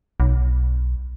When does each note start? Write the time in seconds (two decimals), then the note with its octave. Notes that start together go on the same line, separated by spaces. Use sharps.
0.20 B1